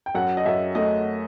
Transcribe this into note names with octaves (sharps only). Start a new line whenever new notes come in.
G5
F#2 F#5
D#5
F#2 E5
A3 D#5